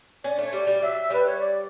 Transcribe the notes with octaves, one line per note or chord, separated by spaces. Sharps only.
C#4 D5
A3
C#5
G3 D5
G3
F#3 E5
G3 B4
C#5
D5